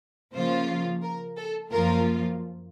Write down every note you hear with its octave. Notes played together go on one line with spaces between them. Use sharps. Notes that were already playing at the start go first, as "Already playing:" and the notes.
C#3 F3 A#3 F4 C5
A#4
A4
F#2 F3 A#3 F4 A#4